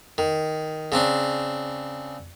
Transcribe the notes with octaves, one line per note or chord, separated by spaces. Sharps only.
D#3
C#3 C4 D4